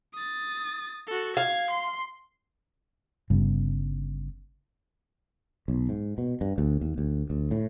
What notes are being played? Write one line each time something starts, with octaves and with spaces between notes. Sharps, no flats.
D#6 A6
F#4 A4
F5 G#6
C6
G1 G2 C#3
B1
G#2
B2
G2
D2
D#2
D2
D2
A2